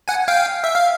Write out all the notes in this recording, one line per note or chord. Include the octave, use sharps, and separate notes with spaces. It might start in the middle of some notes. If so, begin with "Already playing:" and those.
F#5 G#5
F5 G5
E5
F5